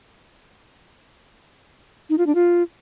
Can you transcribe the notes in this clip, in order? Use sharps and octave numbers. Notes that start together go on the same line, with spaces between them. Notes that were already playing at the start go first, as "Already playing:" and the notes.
D#4
F4
D4
F4